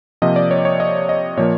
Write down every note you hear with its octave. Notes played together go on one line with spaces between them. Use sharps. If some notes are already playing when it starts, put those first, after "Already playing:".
C3 F3 A#3 D#5
D5
C#5
C#5
D#5
D#5
A#2 F3 A#3 C#5